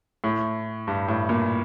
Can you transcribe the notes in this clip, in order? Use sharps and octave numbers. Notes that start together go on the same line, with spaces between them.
A2
G2
A2
A#2